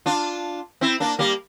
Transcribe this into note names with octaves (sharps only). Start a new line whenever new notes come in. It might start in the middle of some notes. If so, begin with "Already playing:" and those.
D4 F4
C4 E4
A#3 D4
G3 A#3